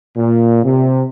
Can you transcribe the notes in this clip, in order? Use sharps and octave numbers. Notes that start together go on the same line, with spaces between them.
A#2
C3